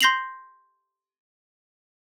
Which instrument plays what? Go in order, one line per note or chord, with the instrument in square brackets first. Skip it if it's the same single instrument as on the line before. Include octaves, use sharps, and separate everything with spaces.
[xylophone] C6 G6 A#6 C7 F7 F#7